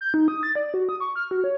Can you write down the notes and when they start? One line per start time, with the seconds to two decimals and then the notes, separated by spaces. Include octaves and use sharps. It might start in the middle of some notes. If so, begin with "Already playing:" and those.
0.01 G6
0.14 D#4
0.28 D#6
0.43 A6
0.55 D5
0.74 F#4
0.89 D#6
1.00 C#6
1.16 F6
1.31 F#4
1.44 C#5